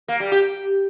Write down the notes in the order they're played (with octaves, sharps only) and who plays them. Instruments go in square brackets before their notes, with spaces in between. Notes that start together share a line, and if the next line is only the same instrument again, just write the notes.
[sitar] A#3
G3
G4